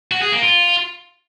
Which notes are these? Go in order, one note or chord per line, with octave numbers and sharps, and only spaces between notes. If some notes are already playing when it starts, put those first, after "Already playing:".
F#4
G#4
A#3
F4